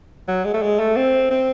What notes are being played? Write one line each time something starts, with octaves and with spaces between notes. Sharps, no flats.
F#3
G#3
A3
G#3
A3
C4
C4